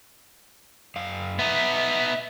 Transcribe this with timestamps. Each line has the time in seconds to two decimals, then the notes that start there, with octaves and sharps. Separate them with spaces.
0.96 F#2 F5
1.39 B3 D#4 E5